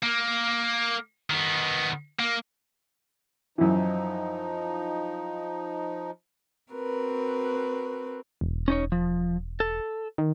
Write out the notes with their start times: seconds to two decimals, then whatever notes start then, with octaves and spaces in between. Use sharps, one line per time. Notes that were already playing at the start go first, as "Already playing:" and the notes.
0.03 A#3
1.30 D#3 B3
2.19 A#3
3.58 F#2 E3 F3 D#4
6.72 C4 F#4 A#4 B4
8.41 E1
8.68 C#4 D#4 C#5
8.92 F3
9.60 A4
10.18 D#3